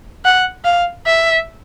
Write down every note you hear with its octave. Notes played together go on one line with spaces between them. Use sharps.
F#5
F5
E5